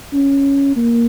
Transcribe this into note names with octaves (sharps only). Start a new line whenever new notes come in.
C#4
A#3